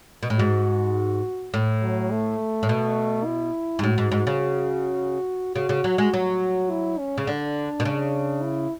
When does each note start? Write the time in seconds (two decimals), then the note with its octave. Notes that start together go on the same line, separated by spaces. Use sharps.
0.23 B2
0.30 A2
0.39 G#2 F#4
1.54 A2
1.82 F#3
2.12 A3
2.63 A2
2.69 B2
3.26 E4
3.79 G#2
3.83 A2 F#4
3.98 G#2
4.12 G#2
4.27 C#3
5.55 C#3 F#4
5.69 C#3
5.84 F#3
5.98 G#3
6.13 F#3
6.70 E4
6.99 C#4
7.18 C#3
7.27 D3 D4
7.80 B2
7.85 C#3
8.43 E4